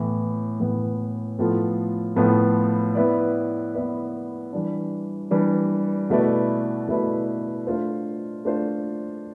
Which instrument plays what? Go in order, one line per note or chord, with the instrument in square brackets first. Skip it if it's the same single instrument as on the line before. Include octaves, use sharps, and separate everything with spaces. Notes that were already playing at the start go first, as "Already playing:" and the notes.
Already playing: [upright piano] A2 E3 B3
A2 E3 B3
A2 F3 B3 F4 A4
A2 F3 B3 F4 A4
B3 E4 B4 D5
B3 E4 B4 D5
E3 G3 D4
E3 G3 D4
B2 A3 E4 B4 D5
B2 A3 E4 B4 D5
A3 D4 F4 C5
A3 D4 F4 C5